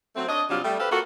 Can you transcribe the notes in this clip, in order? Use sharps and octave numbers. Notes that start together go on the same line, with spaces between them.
F#3 A3 C4
D4 C#5 D#5
C3 F#3 G3 D4 F4
G3 A3
G4 A4 B4 C5 F5
A#3 F4 F#4 A4